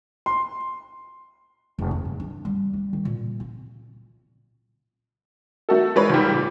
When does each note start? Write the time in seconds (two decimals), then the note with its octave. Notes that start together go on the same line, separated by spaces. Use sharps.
0.26 C6
1.79 F1
1.91 E2
2.05 G2
2.20 D4
2.45 G3
2.73 G3
2.93 D#3
3.05 A#2
3.40 C4
5.69 A3 F#4 A4
5.96 G#3 B4 C#5
6.09 C#2 G#2 G3
6.34 A#2